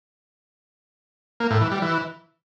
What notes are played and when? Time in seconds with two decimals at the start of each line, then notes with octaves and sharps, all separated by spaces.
1.40 A#3
1.51 A2
1.61 E3
1.71 G3
1.82 E3